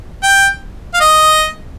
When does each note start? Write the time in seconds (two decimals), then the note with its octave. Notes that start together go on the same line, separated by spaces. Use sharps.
0.23 G5
0.94 F5
1.00 D#5